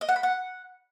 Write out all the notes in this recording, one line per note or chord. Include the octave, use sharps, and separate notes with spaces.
D#5
F#5
B5
F#5